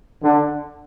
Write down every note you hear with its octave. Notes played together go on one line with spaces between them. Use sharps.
D3